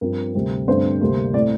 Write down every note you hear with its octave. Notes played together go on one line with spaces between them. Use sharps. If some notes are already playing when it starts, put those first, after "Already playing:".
G2 F3 C4 A#4
D2 C3 G3 C4
G2 D3 A3 C4 C5
D2 C3 G3 A#3
A2 A3 C4 D5